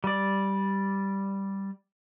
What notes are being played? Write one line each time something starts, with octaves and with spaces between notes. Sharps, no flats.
G3 D5